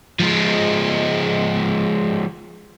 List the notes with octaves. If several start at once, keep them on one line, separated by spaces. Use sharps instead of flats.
F3 G#3